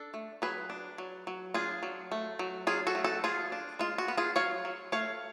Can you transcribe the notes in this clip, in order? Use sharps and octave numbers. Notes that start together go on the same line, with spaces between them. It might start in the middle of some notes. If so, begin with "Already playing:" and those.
Already playing: D4 A4
A3
F#3 G#4 B4
D4
F#3
F#3
D4 F4 G#4
F#3
A3
F#3
F#3 F4 G#4
F#4 A4
A3
F#4 A4
F3 F4 G#4
D4
G#3 F4
F#4
B3
F4 G#4
F#3 C#5 F5
F#3
A3 C#5 F5